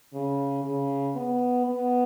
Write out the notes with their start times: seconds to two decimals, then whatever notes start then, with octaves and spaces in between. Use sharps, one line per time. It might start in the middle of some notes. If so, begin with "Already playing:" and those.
0.14 C#3
0.64 C#3
1.15 B3
1.66 B3